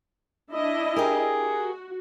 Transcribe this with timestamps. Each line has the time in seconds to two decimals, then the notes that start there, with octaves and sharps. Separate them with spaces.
0.52 D4 E4 D#5
0.96 G4 G#4 A#4
1.40 F#4